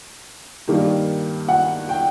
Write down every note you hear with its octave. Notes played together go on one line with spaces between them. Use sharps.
G2 D#3 G3 A#3
F#5
G5